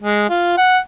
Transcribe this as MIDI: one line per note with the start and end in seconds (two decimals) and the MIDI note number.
0.02 0.27 56
0.29 0.53 65
0.58 0.78 78